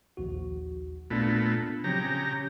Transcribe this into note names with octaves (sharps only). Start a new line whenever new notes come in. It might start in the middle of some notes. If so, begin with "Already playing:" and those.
A#1 D#2 F#4
A#2 A3 B3 D4 F4
C#3 F3 F#3 C4 G4 A#5
C#4